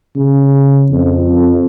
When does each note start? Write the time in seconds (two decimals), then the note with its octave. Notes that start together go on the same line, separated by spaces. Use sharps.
0.16 C#3
0.91 F2